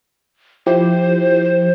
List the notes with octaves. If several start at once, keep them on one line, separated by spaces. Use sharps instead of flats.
F3 E4 G4 C5